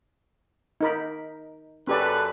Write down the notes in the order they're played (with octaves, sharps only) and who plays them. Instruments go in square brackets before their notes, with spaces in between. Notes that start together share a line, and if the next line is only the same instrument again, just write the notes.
[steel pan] D#4 A#4 B5
[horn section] F#2 A4 B4 [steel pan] C#4 G4 D5